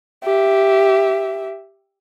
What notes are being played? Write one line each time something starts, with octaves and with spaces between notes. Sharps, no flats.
G4 E5